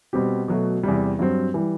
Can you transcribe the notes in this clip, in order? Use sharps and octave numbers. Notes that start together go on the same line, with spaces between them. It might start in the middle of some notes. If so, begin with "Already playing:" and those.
B2 G3 C4 G4
B2 F#3 A3
E2 C3 G3
G2 F#3 C4
E3 G3